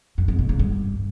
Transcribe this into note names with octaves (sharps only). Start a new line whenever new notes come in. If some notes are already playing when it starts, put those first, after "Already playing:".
F#2
F2
B2
C#3
G2